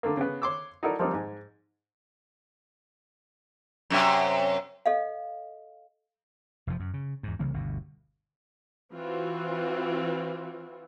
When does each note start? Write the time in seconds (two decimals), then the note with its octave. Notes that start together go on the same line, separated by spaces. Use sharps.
0.03 D3 A3 A#3
0.17 C#3 B3
0.42 C#5 C6 D6 E6
0.83 D#4 E4 F#4 A4 A#4 D5
0.99 F3 G3 A#3 C4 D#4
1.13 G#2 G#5
3.90 F#2 C3 E5
4.86 A4 D#5 F5
6.67 F1 F2 A#2 F3
6.80 F#2
6.94 C#3
7.23 E2 G#2
7.39 C2 C#3 E3 A#3
7.54 G1 D2 B2
8.93 E3 C4 F4 F#4